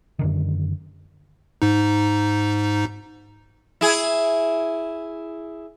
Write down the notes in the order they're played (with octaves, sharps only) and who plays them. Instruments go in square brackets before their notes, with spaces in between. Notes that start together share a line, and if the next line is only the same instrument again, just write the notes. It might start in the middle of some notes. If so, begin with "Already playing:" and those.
[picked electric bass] F#2 D3 D#3
[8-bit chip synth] G#2 D#4
[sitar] E4 G#4